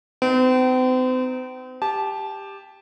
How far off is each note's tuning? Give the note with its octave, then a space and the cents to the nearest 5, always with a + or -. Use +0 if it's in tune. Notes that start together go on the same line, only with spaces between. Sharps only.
C4 -40 D#4 +0
G4 +10 A5 -20